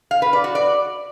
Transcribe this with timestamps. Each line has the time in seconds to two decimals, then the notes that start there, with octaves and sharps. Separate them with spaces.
0.11 F5
0.22 B4
0.33 D5
0.44 F#4
0.55 D5